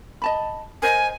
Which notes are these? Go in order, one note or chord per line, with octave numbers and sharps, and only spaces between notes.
D#5 A5 B5
A#4 C5 D#5 G#5